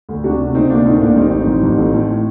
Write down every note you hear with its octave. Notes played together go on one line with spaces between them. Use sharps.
D2
C3 D4 F#4
C3
C3 C4 D#4
D2 A#3 D4
A2 C4 D#4
A2 A#3 D4
A1 C4 D#4
A2
A1
A1
A2
A2